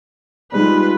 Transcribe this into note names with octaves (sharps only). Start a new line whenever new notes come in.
G3 G#3 D#4 F4 B4